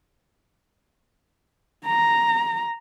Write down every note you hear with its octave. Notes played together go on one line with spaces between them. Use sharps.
A#5